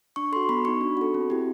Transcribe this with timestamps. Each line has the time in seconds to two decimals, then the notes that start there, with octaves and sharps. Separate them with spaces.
0.16 D4 C#6
0.32 A4 C6
0.36 F#4
0.49 B3 B5
0.64 F#4 C#6
0.68 D#4
0.81 D4
0.97 F#4 A4
1.14 C4
1.30 E4 G4